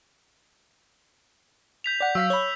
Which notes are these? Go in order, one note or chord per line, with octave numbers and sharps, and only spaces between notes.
G6 B6 F7
D5 F#5
F#3 F5 E6 B6
C#5 B5